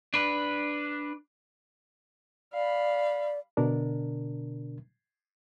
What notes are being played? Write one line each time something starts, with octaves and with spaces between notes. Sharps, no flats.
D4 B4
D5 F5 B5
B2 D3 D4 A#4